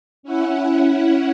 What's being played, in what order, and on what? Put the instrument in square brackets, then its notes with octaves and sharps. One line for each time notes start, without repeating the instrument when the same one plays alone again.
[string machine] C#4 E4 F#5